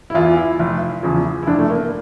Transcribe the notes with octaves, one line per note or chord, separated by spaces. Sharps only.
E4
E2 E3 F4
E4
F1
E2 C#3 F3
E4
F1 D4
A3
A#3